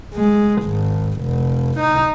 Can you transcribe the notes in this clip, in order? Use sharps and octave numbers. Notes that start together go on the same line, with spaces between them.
G#3
G#1
F1
D#4